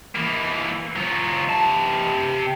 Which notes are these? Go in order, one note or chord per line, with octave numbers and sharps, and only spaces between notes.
E3 A#3
F#3 F4
C3 A5